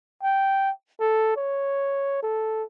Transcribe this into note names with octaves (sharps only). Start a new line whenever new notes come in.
G5
A4
C#5
A4